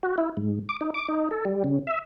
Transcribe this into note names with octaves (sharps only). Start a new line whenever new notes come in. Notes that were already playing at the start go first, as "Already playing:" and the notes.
F#4
E4
G#2
D6
D#4
D6
D#4
A4
G3
C#3
E5